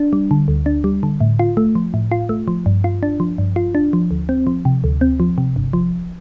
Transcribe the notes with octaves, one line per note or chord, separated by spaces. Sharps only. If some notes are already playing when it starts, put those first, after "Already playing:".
Already playing: D4
G3
D3
D2
D4
G3
D3
A2
F4
A3
F3
A2
F4
A3
F3
G2
F4
D4
F3
G2
F4
D4
F3
D2
C4
F3
C3
D2
C4
F3
C3
G1
F3